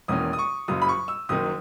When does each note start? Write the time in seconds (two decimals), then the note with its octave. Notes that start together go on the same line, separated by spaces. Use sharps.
0.08 E1 E2 D#3 A#3 C#4 D#6
0.33 D#6
0.39 C#6
0.68 F#1 F#2 C#3 D#6
0.82 B5
0.89 C#6
1.08 E6
1.29 F#1 F#2 D#3 D#6